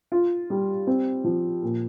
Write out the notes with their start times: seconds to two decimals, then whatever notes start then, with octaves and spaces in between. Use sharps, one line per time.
0.12 F4
0.50 G3
0.87 C4
1.24 F3
1.63 A#2